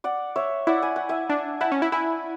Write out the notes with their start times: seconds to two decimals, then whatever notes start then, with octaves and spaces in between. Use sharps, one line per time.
0.04 D5 F#5
0.36 C#5 E5
0.67 E4 D5 F#5
0.82 G#5
0.96 F#5
1.09 E5 G#5
1.29 D4
1.61 E4 F#5 A5
1.72 C#4
1.82 E4
1.92 E4 G#5 B5